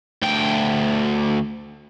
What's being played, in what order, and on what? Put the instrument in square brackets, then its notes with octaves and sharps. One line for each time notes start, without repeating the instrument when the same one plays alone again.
[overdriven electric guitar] D2 G5